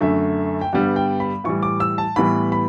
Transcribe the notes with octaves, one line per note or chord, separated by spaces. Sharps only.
F#2 D3 A3 E5
G5
G2 D3 G3 B3 F#5
G5
B5
A2 E3 G3 C#6
D6
E6
A5
A2 E3 G3 B3 B5
B5